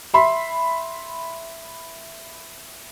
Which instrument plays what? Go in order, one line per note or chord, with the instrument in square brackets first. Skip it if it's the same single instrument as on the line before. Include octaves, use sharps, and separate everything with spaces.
[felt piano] E5 B5 C6